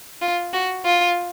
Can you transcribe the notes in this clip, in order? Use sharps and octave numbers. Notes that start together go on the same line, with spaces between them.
F4
F#4
F4